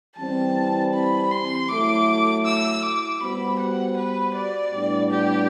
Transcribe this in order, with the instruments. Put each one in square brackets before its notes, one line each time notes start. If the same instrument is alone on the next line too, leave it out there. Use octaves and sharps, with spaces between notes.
[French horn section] E3 G3 C4 [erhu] A5
[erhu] B5
C6
[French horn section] F#3 A3 E4 A4 [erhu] D6
[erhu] E6
D6
[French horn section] G3 B3 F#4 C5 [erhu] B5
[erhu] F#5
B4
D5
[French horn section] A2 G3 B3 D4
[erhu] G4